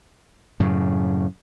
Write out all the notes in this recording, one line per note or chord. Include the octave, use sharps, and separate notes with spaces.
F#2 A2 C#3